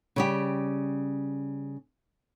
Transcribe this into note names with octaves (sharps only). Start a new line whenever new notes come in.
C#3 G3 G4